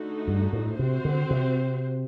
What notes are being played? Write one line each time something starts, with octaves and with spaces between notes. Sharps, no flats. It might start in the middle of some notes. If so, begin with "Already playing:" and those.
Already playing: D3 A3 D#4 F#4
G2
A2
C3 C4 F#4 C5
D3
C3